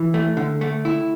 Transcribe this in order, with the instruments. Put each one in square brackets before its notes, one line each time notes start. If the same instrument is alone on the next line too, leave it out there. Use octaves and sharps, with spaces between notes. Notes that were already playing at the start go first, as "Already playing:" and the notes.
Already playing: [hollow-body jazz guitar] E3
A3
D3
A3
E4